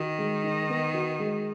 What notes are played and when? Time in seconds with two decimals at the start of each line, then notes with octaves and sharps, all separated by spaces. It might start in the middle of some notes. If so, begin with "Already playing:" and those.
Already playing: D#3 F#4
0.19 G#3
0.44 D#4
0.70 B3
0.94 F#4
1.20 G#3